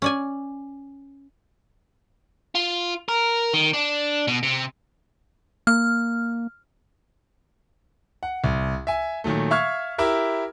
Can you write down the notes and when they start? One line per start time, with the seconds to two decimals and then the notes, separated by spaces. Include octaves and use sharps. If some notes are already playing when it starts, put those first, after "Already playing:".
0.02 C#4 D5 G#5
2.55 F4
3.08 A#4
3.54 D#3
3.73 D4
4.28 B2
4.43 C3
5.67 A#3 F6
8.23 F#5
8.44 C2
8.87 E5 G#5
9.24 A#2 D#3 F#3 A3
9.51 E5 F5 C#6 F6 G#6
9.98 E4 G4 A#4 E5